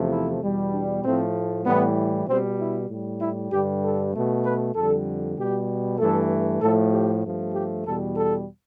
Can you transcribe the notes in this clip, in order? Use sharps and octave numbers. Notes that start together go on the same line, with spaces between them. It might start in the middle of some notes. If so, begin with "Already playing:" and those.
Already playing: E2 C3 F3 A3
E4
E2 B2 G3
D4
A2 F3 A3 C4
A2 E3 G3 B3
B2 G3 C4
E4
A2 G3
E4
G2 D3 G3 G4
A4
B2 A3
B4
F2 D3 G3 A4
B2 G3 G4
G2 E3 A3 A4
A2 F3 A3 A4
G4
G2 F3 A3
G4
E2 B2 G3 A4
A4